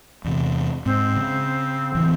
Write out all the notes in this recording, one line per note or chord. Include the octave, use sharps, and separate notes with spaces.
E2 C3
G#2 C4
C#3
D1 E3